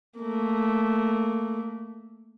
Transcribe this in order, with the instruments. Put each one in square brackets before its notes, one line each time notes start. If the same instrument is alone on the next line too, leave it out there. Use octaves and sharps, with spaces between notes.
[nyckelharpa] A3 A#3